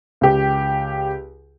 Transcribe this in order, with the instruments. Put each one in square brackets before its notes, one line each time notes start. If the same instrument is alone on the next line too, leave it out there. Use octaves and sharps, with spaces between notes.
[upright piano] C#2 G4